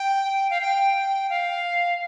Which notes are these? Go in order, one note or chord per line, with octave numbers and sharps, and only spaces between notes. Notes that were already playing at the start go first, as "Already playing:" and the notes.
Already playing: G5
F5
G5
F5